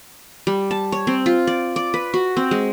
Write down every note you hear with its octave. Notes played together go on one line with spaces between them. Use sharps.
G3
A5
C#5
C4
F4
D5
D5
B4
F#4
C4
G#3